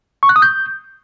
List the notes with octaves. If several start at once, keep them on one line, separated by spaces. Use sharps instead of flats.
C#6
F#6
D#6
G6